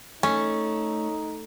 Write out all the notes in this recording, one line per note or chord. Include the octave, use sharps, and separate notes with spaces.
A3 C#4 D#4